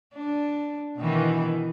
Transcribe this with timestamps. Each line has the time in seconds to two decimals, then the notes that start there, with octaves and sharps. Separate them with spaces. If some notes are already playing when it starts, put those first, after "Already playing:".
0.15 D4
0.98 B2 D#3 E3